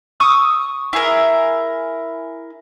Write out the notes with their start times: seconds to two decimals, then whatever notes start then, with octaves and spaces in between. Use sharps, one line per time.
0.20 C#6 D#6 E6
0.93 E4 G#4 A#4